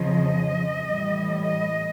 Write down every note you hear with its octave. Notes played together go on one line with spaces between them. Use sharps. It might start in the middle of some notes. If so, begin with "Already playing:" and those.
Already playing: F2 C#3 F3 D#5
A2 E3 G3
D#5